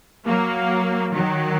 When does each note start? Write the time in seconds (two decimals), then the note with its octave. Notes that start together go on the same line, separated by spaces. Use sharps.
0.26 F#3 A#3
1.14 D#3 F#3